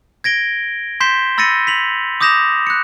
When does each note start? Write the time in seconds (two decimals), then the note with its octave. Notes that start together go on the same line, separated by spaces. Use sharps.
0.24 G#6 A#6 D7 G7
1.00 C6 G6 B6 C7 E7 G7
1.38 B5 E6 A6 A#6 C#7 D#7
1.67 B6 F7 F#7
2.21 D6 D#6 G6 A#6 E7 F7
2.67 F#6 C#7